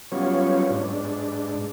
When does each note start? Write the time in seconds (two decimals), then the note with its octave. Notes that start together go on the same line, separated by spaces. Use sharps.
0.12 F#3 G3 B3 C#4 F4 C#5
0.70 G#2 D4